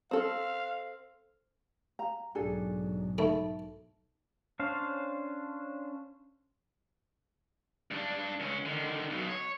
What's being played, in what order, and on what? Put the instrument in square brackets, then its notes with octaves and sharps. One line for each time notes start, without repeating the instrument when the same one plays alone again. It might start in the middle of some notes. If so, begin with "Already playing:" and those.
[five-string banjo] C4 A4 [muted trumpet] F5
[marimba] F5 [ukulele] A#5
[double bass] B1 G#2 [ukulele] D4 G#4 A4
[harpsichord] C#3 A3 [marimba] D#4 E5 B5 [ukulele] A5
[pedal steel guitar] C#4 D4 C5 F5
[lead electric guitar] G2 D4
C#2 C#4
D3 D#3
B1 B2
C#5